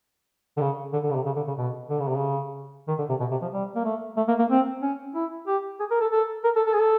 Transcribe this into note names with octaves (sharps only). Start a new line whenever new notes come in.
D3
C#3
D3
D3
C#3
C3
C#3
D3
C#3
B2
D3
C#3
C3
C#3
D#3
D3
C3
B2
C3
F3
G3
A#3
A3
A3
A#3
A#3
C4
C#4
E4
G4
G#4
A#4
A4
A4
A#4
A4
A4
G#4
A4